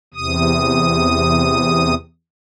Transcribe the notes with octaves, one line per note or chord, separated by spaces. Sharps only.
E2 C3 D#6